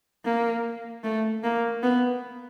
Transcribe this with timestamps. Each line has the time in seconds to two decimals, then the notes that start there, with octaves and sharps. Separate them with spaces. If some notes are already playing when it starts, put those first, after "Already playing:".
0.25 A#3
1.04 A3
1.44 A#3
1.83 B3